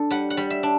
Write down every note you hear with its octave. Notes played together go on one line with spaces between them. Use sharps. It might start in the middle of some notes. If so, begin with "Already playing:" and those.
Already playing: D4 A4
G3 F#5
F#5
G3
E5
D4